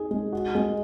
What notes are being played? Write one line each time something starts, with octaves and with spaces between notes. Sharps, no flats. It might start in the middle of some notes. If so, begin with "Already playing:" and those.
Already playing: D#4 G#4
G#3
F#4
G#3